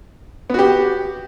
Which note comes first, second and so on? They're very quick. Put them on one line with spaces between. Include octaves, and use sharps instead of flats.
B3 F#4 G4